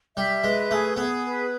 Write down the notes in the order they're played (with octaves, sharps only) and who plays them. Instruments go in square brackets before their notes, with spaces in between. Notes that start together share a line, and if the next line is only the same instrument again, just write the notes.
[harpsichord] G3 [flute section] E5
[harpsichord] G#3 [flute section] B4
[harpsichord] A3 [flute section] G#4
[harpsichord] B3 [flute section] G#4
[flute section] B4